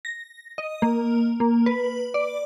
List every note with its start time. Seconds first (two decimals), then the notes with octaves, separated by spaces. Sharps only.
0.05 A#6
0.58 D#5
0.82 A#3
1.40 A#3
1.66 B4
2.14 D5